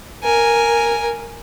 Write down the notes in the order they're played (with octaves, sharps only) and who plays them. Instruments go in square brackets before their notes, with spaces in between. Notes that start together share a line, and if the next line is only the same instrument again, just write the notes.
[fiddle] A#4 G#5